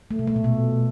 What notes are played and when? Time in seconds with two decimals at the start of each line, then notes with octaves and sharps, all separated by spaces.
0.11 A3
0.19 B2
0.27 A3
0.36 A#2
0.44 B2